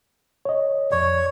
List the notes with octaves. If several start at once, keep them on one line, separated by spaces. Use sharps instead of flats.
C#5 D#5
F2 C#5 D5